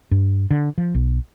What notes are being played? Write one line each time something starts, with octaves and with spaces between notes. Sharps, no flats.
G2
D3
F3
B1